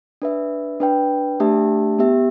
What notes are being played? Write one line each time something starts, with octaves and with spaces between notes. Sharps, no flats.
D4 B4 E5
D4 B4 G5
A3 D4 G4 E5 A5
B3 G4 E5